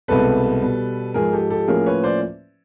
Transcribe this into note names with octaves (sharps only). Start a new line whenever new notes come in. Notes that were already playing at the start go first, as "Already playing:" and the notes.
C2 B2 G#3 C4 A4 B4
B2 G3 B3
G#2 F3 G#3 G#4 A#4
G4 A4
G4 A4
A2 F3 A#3 C#4 G#4 A#4
B4 C#5
C5 D5